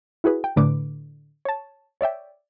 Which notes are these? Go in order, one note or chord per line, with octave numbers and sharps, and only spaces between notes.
E4 F#4 G#4 B4
G5
A2 D3 B4 D6
C#5 A5
C#5 D5 E5 G5